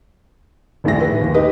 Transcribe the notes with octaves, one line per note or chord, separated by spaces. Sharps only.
D#1 A#1 A2 E5 A#6
B4
D#2
D#4 G4 B4 D#5 D#6